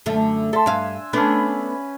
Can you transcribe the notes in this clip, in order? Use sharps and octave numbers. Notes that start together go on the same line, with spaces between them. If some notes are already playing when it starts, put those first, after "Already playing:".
F#2 D3 A3
A4 E5 A5 C6
G2 D4 F5 G#5 E6
A3 B3 C#4 D4 B4